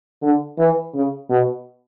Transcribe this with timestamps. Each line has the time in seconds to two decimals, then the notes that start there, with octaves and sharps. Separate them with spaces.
0.22 D3
0.58 E3
0.94 C#3
1.30 B2